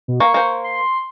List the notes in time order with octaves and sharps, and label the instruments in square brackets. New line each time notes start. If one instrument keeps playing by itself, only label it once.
[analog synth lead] B2
[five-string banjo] A#3 [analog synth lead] C#6
[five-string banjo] A#3 C5
[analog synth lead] C6